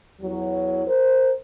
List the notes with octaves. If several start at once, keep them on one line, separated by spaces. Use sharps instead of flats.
E2 E3 F#3
A#4 C5